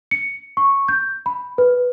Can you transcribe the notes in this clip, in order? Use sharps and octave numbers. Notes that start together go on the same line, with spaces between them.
C#7
C#6
G6
B5
B4